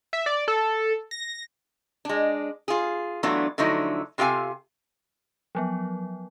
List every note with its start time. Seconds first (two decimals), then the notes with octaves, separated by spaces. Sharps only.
0.13 E5
0.26 D5
0.48 A4
1.11 A#6
2.05 G#3 D4
2.68 F4 G#4
3.23 E3 F#3 A3 B3 D4 F4
3.58 D3 F3 F#3 A3 D#4 E4
4.18 C3 F4 G4 A4 F5 G#5
5.55 F3 F#3 B3